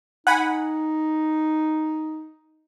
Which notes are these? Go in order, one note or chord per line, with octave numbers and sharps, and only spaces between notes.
D#4 F#5 G#5 B5